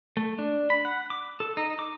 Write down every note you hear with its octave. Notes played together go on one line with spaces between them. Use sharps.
A3
D4
B5
F#5
D6
A4
D#4
D6